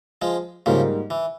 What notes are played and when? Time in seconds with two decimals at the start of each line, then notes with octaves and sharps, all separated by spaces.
0.22 F3 G#3
0.66 G#2 C#3 F3 G3 A#3
1.10 E3